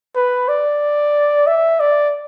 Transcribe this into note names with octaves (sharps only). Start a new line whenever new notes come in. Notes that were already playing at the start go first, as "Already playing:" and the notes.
B4
D5
E5
D5